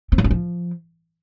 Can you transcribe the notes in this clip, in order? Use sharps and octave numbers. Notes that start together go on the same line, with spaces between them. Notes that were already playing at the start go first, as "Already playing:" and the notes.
C4
F#3
C#4
F3